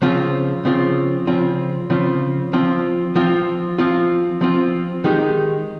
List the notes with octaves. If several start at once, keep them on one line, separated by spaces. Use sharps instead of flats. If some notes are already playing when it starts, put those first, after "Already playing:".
C#3 F3 C4 F4
C#3 F3 C4 F4
C#3 F3 C4 F4
C#3 F3 C4 F4
F3 C4 F4
F3 C4 F4
F3 C4 F4
F3 C4 F4
D#3 G#3 D#4 G4